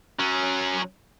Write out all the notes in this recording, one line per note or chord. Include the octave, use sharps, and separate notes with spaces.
F#3 C#4